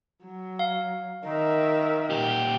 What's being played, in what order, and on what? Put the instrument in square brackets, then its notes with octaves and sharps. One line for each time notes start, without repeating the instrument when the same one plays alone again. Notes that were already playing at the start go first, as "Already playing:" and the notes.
[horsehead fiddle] F#3
[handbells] F5
[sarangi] D#3 [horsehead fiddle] A#4 E5
[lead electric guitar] A#2 G4